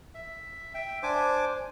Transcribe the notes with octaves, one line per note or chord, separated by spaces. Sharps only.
E5
E5 G5
D4 C5 G#5 D6